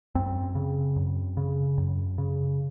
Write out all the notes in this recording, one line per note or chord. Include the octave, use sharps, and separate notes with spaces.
F#2 C4
C#3
F#2
C#3
F#2
C#3